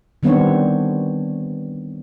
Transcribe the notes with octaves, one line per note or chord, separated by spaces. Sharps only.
D#3 G3 B3 C4 D4 C#5